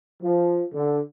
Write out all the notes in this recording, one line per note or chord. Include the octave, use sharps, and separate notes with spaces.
F3
D3